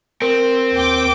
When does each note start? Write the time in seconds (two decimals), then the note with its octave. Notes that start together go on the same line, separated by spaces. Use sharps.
0.22 C4 A#4
0.73 D#2 G5 D6